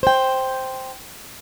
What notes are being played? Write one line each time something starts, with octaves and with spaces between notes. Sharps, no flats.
C5 G5